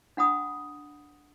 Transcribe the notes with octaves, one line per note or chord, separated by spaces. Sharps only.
D4 F#5 B5 D#6